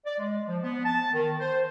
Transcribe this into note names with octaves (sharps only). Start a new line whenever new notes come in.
D5
G#3
F3
B3
A5
D#3
C5